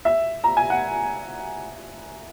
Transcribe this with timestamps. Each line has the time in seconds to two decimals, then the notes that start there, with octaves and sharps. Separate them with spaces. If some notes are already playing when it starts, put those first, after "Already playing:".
0.05 E5
0.44 A#5
0.57 G#5
0.70 F#5